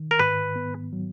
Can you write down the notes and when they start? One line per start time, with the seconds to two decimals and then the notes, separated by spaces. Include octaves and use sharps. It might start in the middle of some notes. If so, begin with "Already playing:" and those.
Already playing: D#3
0.11 A#4
0.19 G#2 B4
0.56 B3
0.93 F#3